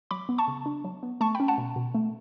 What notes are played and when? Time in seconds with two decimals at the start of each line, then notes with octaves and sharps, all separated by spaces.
0.11 F#3 B5 D6
0.29 B3
0.38 A5 C#6
0.48 C#3
0.66 D4
0.85 F#3
1.03 B3
1.21 A3 A5 C#6
1.35 G5 B5
1.40 C#4
1.48 F#5 A5
1.58 B2
1.76 B2
1.94 A3